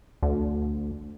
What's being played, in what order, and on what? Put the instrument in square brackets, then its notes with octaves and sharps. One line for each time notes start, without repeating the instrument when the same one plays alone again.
[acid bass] D2